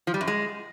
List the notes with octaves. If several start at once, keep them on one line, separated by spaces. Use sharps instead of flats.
F3
G3
F#2
G#3